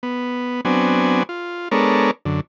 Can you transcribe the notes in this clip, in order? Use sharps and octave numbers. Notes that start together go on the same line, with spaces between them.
B3
F#3 B3 C4 D4 G#5
F4
G#3 B3 D4 A4 A#4 C#5
F#2 D3